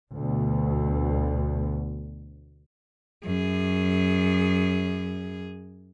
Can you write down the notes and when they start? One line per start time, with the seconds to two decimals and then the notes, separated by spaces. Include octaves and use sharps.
0.12 D2 B2
3.24 F#2 G#4